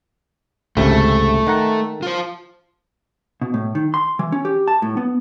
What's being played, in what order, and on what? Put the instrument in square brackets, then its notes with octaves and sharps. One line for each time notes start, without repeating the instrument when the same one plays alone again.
[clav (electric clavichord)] G#1 C#2 C3 [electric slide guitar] A3
[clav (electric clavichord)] D#3 F#5 A#5
[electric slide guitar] F4 C5
[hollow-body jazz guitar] B2
A2
D#3
C6
E3
C#4
G4
A5
A2
B3